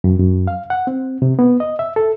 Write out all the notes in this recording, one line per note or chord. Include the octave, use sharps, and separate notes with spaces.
F#2
F#2
F5
F#5
C4
C3
B3
D#5
E5
A4